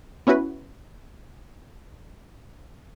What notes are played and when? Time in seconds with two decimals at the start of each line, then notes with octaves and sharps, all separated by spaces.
0.27 B3 C#4 E4 F#4 B4